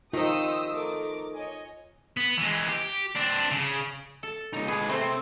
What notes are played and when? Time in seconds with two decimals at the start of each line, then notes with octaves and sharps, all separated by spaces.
0.13 D#3 D#4 F4 G4 C5 D#6 E6
0.71 A3 A#4 D6
1.33 C#5 D#5 G#5
2.17 B3
2.38 E3 G#3
2.69 G4
3.15 C4 D4
3.51 C#3
4.23 A4
4.53 C#2 D#4
4.68 G#3 G#4 B4
4.89 C3 A3 C4